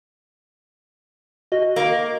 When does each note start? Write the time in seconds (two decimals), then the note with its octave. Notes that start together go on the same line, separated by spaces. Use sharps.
1.52 F#4 D#5
1.76 A#3